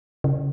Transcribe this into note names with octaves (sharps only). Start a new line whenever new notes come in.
C#3